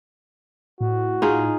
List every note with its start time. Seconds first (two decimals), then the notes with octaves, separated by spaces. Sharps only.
0.80 A2 F#4
1.22 D#4 F4 G#4